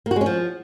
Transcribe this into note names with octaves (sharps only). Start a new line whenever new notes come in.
A#3
F#4
G#3
C#4
F3